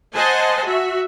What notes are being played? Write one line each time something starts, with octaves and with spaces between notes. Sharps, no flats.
C5 D#5 F#5 G#5 A5 C6
F#4 E5